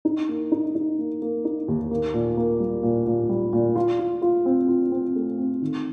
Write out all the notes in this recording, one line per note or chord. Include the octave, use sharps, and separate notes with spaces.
D#4
A#3
D#4
D#4
A#3
A#3
D#4
D#2
A#3
A#2
A#3
G3
A#2
A#2
G3
A#2
F4
F4
F4
C4
F4
C4
A3
C4
D#3